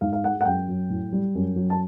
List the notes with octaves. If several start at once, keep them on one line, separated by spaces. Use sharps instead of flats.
G#2 F5
F5
G#3 F#5
F#5
F#2 G5
F#3
A2
G3
F#2
F#3
A5